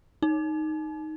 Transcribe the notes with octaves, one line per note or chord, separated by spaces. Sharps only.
D#4